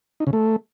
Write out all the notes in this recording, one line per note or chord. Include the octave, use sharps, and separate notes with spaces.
D#4
C#3
A3